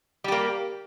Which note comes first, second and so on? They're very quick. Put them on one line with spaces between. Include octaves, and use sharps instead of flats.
G3 G4 A#3